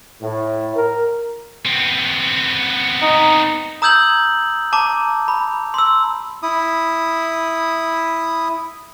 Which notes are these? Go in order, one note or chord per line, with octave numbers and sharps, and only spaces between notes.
A2
A#4
B3 C4
D#4
A#5 D#6 E6 G6 G#6 F#7
A5 A#5 D6
B5
C6 E6
E4 D#6